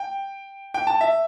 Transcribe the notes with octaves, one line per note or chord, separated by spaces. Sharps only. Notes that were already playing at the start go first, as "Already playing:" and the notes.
Already playing: G5
G5
A5
E5